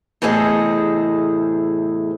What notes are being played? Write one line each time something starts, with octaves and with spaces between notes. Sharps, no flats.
E2 A2 C3 G#4 A4 D#5